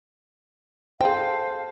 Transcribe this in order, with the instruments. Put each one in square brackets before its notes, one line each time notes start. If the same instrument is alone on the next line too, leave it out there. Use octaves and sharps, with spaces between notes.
[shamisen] G#4 G5 [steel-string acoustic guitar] A4 [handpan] C5 [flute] F5